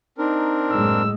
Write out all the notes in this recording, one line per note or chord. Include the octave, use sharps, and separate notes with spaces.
C4 D4 D#4 A#4
F#1 A2 G#3 E6